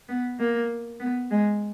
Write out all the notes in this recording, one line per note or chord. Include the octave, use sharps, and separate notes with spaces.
B3
A#3
B3
G#3